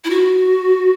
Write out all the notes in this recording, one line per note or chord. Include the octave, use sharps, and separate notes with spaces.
E4
F#4